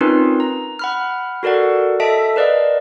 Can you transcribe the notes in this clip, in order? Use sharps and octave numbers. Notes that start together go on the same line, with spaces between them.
C4 C#4 D#4 F4 A#4 B4
A#5
F#5 B5 F6
F#4 A4 A#4 D5 F#5
A4 D#5 E5 A5 B6 D7
A#4 B4 D5 D#5 F5